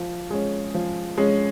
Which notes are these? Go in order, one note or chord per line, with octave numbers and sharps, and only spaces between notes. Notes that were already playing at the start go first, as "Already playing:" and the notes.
Already playing: F3
G#3 C#4
F3
G#3 C#4